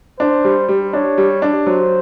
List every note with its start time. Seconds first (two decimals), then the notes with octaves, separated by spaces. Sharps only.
0.20 D4 C5
0.44 G3
0.68 G3
0.93 D4 C#5
1.18 G3
1.42 D4
1.66 F#3 C5